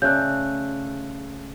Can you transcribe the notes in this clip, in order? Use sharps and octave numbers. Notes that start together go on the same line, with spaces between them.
C#3 A3 D5 F#6 G6